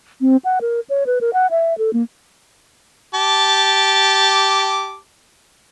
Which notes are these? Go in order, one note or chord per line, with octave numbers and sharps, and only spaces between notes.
C4
F#5
A#4
C#5
B4
A#4
F#5
E5
A4
A#3
G4 A5 D6